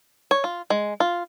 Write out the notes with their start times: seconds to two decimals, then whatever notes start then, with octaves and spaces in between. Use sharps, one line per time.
0.31 C#5
0.44 F4
0.70 G#3
1.00 F4